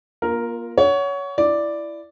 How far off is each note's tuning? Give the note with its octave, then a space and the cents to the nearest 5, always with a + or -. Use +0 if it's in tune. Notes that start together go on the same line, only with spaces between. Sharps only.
A#3 +35 F4 +0 A#4 +0
C#5 +20 F#5 +0
E4 +15 D5 +0